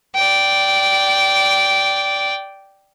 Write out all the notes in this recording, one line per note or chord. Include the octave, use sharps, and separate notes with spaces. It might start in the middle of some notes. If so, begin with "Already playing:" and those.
D5 G5